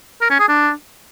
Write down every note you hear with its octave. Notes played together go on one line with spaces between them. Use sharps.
A#4
C#4
G#4
D4